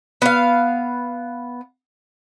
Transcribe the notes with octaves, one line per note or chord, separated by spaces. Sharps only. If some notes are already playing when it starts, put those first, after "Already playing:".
B3 F5